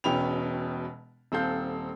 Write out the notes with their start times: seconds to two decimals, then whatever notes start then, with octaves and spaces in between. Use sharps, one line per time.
0.04 E1 B2 C#4 G5 B5 F7
1.32 D#1 C4 A4 F5 G6